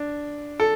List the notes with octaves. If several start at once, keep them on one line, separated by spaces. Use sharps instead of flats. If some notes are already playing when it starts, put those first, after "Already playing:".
Already playing: D4
A4